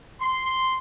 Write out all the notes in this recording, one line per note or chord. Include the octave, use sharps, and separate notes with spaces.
C6